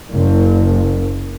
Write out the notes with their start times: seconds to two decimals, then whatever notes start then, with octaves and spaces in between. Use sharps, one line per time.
0.11 F#1